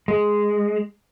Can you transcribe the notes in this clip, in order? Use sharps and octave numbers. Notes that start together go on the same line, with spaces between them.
G#3